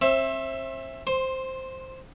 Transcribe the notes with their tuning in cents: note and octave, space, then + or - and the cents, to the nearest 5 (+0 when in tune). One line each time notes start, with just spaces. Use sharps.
C4 +35 C5 +40 E5 +0
C5 +0 C6 +20